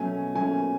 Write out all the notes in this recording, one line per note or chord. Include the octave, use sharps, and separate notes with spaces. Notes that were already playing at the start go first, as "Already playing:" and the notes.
Already playing: B2 F#3 A3 C#4 G#5
B2 F#3 A3 C#4 G#5